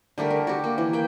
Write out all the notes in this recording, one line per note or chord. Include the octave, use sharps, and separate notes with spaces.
D3 G3 A3 A#4
A#4
F#4 G4
A#3
E3
A#3 G5